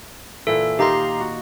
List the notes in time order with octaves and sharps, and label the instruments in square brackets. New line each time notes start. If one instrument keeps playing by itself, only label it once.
[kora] A#2 E3 [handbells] A4
[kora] D#3 A#3 D#4 [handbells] G4 A#5 C6
[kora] F#4